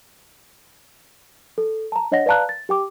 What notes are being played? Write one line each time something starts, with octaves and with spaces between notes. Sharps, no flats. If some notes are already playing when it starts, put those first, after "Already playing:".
A4
A5 A#5
D4 C#5 D#5 F#5 A#6
B4 D5 F5 A5 A#5 F#6
A6
G4 G5 D6